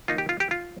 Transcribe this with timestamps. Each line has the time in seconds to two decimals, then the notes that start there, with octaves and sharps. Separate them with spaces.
0.08 D#3 A#3 D#4 F4
0.18 G4
0.29 F4
0.40 G4
0.51 F4